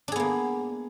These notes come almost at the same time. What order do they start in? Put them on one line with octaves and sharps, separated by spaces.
D4 G#4 B3 A#3